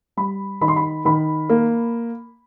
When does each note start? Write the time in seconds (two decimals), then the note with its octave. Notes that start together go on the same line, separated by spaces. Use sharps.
0.17 G3 B5
0.61 D#3 B5
0.68 C6
0.76 B5
1.05 D#3 B5
1.49 A#3